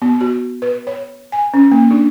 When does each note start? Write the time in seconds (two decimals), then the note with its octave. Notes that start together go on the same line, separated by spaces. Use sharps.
0.02 B3
0.21 F#4
0.62 B4
0.87 C#5
1.32 G#5
1.54 C#4
1.72 A#3
1.91 D4